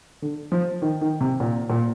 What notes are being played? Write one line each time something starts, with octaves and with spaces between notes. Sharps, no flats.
D3
F3
D#3
D#3
C3
A#2
A#2